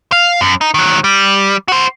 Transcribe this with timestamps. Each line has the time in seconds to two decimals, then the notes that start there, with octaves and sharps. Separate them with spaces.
0.12 F5
0.41 F#2
0.61 D#4
0.74 D#3 F#3
1.04 G3
1.68 F#4 C5